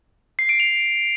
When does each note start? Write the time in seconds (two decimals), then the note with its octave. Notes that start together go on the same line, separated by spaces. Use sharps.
0.39 C7
0.49 D7
0.60 F7